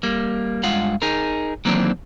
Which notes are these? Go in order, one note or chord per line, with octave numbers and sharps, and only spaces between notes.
G3 A#3
G2 G#3 F4 F5 F#5
D#4 G#4 A#4
D#3 E3 F#3 A#3 C4 D4